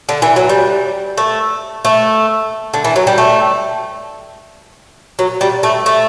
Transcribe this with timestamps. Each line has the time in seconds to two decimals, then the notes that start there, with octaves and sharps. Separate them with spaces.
0.09 D3
0.22 E3
0.36 F#3
0.49 G3
1.18 A3
1.85 A3
2.74 D3
2.84 E3
2.96 F#3
3.07 G3
3.18 A3
5.19 F#3
5.41 G3
5.63 A3
5.86 A3